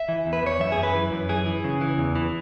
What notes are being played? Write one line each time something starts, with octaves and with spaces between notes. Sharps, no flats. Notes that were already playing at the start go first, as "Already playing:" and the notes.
Already playing: E5
E3
E2
B4
E2 C#5
F#2 E5
G#4
F#2
B4
E3
F#2
E3 G#4
E3
C#3
E3
E2
E3